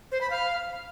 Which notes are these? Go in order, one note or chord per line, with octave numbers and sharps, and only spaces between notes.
C5
B5
F5